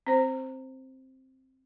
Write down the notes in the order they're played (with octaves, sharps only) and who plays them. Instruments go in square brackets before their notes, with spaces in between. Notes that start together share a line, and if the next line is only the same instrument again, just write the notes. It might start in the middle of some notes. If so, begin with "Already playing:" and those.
[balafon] C4 C5